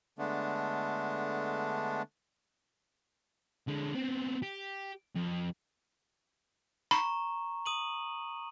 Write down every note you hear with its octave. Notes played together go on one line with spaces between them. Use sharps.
D3 G#3 A3 B3 D4
D3 G#3
B3 C4
G4
F2
A#5 B5 C#6
D#6 D#7 F#7